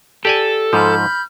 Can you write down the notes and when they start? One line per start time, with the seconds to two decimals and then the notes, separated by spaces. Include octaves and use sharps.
0.25 G4 A4 D5 G#5
0.73 G#2 F3 B5 F6 G6